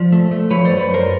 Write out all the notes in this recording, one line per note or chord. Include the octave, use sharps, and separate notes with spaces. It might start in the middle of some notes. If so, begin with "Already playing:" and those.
Already playing: F3 C5 D5
A3
A3
F3 B4 C#5
F#2 C5 D5
B4 C#5
A3
A#4 C5